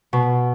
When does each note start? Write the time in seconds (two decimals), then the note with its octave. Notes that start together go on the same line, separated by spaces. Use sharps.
0.13 B2